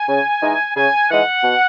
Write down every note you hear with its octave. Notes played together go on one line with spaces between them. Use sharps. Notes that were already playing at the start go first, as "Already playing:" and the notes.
Already playing: G#5
C#3
E3 G#3 D#4
C#3 G#5
E3 G#3 D#4 F#5
B2